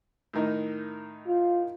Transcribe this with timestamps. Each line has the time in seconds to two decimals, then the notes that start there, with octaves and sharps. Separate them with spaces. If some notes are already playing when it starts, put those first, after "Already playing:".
0.33 A2 D#3 D#4
1.27 F4